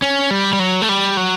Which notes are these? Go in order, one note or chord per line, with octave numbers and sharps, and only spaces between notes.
C#4
G3
G3
F#3
A3
G3
F#3